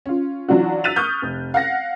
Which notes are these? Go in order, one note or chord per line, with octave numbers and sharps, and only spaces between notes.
C#4 F4
E3 F#3 D4 F4 F#4
E6 F#6 A6 B6 D#7 F7
C#6 D#6 F6 G6
F1
F5 F#5 A#6